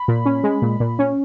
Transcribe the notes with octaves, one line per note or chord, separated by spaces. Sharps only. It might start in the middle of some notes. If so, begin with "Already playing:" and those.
Already playing: B5
A#2
C#4
G#3
A#2
A#2
C#4